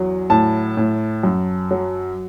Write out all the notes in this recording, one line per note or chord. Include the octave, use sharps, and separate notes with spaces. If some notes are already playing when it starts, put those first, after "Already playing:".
Already playing: E2 F#3
A2 A5
A2
F#2
F#3